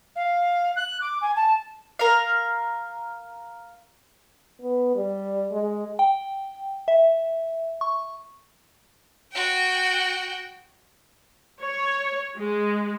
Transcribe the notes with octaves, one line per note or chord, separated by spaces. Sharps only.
F5
F#6
D6
G#5
A5
A#4 F5
B3
G3
G#3
G5
E5
C#6
F#4 G5
C#5
G#3